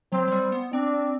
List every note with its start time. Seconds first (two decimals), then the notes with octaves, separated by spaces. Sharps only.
0.12 F#3 C4
0.28 F#3
0.32 G3
0.52 B3
0.72 C4 D4